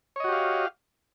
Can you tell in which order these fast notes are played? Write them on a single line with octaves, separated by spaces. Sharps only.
C#5 D#5 F#4 G4 F5